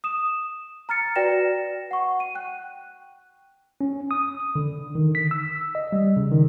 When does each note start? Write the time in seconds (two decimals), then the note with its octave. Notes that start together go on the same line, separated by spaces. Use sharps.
0.04 D#6 E7
0.89 A#5 F6 A6 C#7
1.16 F#4 B4 D5 G5 A#6 E7
1.91 F#5 C#6
2.20 D#7
2.35 G5 F#6
3.81 C#4
4.11 D#6
4.56 D3
4.95 D#3
5.15 B6
5.31 E6
5.75 D#5
5.92 G3
6.17 C#3
6.32 D#3